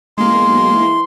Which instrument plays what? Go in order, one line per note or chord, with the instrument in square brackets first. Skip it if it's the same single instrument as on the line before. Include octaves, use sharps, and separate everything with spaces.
[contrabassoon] A1 [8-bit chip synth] G#3 A#3 [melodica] C6
[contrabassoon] E2
B1
E3